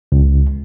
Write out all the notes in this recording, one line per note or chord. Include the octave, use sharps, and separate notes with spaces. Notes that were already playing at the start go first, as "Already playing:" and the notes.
C#2